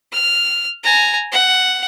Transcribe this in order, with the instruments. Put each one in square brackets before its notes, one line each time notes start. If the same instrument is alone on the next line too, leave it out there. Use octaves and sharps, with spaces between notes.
[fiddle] F6
G#5 A#5
F#5